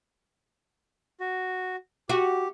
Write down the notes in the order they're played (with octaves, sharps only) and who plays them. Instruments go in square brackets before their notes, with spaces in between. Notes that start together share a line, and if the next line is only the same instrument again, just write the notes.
[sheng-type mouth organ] F#4
[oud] F#4 [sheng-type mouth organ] G4